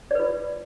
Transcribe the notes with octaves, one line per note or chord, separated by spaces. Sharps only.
F4 B4 D5